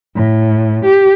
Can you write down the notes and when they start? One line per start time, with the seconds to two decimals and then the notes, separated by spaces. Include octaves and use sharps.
0.16 A2
0.85 G4